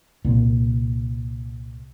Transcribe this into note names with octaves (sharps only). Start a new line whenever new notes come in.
C2 A#2